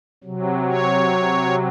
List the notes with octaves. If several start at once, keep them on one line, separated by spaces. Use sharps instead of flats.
C3 F#3
C#5